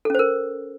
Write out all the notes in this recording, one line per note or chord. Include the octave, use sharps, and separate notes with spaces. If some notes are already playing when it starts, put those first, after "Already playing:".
C#4 A4 A#4 C5